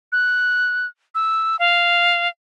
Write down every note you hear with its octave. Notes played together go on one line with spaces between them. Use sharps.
F#6
E6
F5